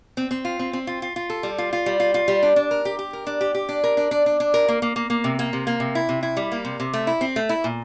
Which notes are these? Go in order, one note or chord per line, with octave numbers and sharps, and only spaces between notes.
C4
C4
F4
C4
C4
F4
F4
F4
A4
G3
F4
F4
G3
F4
F4
G3
D4
D4
A#4
G4
G4
A#4
D4
G4
G4
D4
A#4
D4
D4
D4
D4
A#4
A#3
A#3
A#3
A#3
C3
A#3
C3
A#3
C3
E4
C3
E4
G3
A#3
C3
C3
A3
E4
C4
A3
E4
A#2